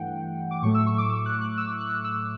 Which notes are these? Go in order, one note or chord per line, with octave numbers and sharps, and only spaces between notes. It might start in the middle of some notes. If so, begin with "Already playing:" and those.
Already playing: G2 E3 A3 F#5 G5
D6
A2 F#3 A3 C#6
E6
C#6
D6
E6
F#6
F#6
E6
F#6
E6